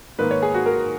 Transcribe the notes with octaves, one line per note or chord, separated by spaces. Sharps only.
G#2 D#3 A#3 B4
C#5
G#4
F#4
A#4